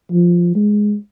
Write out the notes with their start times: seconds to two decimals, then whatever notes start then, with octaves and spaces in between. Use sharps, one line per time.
0.12 F3
0.56 G#3